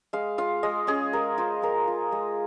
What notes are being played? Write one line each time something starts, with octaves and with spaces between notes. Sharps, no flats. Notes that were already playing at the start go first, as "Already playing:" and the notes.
G#3 F5
F4 F5
G#3 D#5
C#4 G#4
G#3 A#4
F4 C5
G#3 A#4
F4
G#3